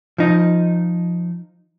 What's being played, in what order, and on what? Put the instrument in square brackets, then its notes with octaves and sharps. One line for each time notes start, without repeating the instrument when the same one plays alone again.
[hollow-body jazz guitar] F3 D#4